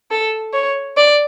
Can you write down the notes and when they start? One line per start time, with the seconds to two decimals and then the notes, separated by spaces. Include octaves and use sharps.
0.11 A4
0.54 C#5
0.97 D5